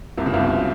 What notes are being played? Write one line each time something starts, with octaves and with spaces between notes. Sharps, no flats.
C2 C3
C#2 C#3
C2 C3
B1 B2